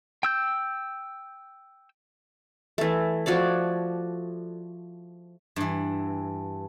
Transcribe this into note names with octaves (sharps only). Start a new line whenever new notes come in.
G5 E6 G6
E3 A3
F3 F#4 C#5 D5
G2 E3